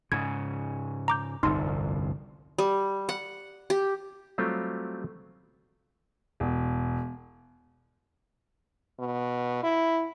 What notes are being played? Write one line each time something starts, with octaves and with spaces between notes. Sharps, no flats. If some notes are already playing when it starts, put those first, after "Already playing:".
G#2 C#3 G#6
A#5 D6 G6
G1 C2 F2 D#4 C6
G3
F#5
G4
F#3 G3 A3 C4 F4 G4
E1
B2
E4